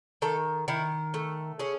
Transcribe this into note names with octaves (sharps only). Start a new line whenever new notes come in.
D#3 A4
D#3 E4
A3
C#4 G#4